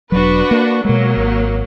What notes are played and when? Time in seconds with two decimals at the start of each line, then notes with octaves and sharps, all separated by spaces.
0.12 E1 F#3 D4 F#4 B4
0.51 A#3
0.85 B2 F#3 G#3 A#3
1.17 G#1